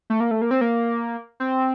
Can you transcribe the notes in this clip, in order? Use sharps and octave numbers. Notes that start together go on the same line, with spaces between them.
A3
A#3
A3
A#3
C4
A#3
C4